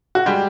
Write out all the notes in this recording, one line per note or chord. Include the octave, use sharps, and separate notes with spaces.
F#4
G3 G#3 G4